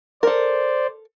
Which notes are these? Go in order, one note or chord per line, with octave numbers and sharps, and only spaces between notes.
A4 A#4 C5 D5